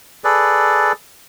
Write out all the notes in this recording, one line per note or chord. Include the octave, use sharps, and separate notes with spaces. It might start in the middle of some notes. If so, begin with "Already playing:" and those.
G#4 A4 B4 D5